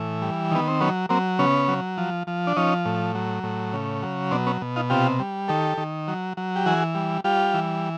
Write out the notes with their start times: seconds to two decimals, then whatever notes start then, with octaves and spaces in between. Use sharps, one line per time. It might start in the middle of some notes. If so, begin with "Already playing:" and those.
Already playing: A2 E3
0.22 G3
0.51 D#3 B3
0.68 C4
0.80 F#3 B3 C#4
1.09 F#3 A#3 C4
1.39 C#3 B3 C#4
1.68 F#3
1.98 F3
2.27 F3
2.47 D4
2.57 F3 C#4 D#4
2.85 A2
3.15 F#3
3.43 A2
3.73 C#3
4.03 F#3
4.31 B2 C4 D4
4.47 B3 C#4
4.62 B2
4.76 D#4 F4
4.90 C3 F4 G4
5.19 G3
5.48 D#3 G4 A4
5.78 D#3
6.08 F#3
6.37 F#3
6.56 G4
6.66 E3 F#4 G#4
6.95 G3
7.24 G3 F4 G4
7.53 E3